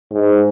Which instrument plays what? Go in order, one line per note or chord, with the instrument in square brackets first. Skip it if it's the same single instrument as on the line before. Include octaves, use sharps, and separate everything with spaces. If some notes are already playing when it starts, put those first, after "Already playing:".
[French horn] G#2